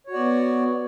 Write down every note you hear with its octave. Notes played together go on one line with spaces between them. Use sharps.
B3 F#4 C#5 D5